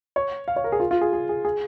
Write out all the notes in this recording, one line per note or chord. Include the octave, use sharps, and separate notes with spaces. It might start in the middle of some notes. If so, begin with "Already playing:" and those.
C#5
F5
C#5
A#4
G#4
F4
F4
G#4
G#4
G#4
G#4